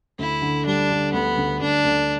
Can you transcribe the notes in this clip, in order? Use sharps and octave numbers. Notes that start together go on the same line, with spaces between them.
D2 E4
D3
G3 D4
D3
D2 B3
D2
D2 D4
D2